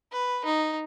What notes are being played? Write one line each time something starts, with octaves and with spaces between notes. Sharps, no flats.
B4
D#4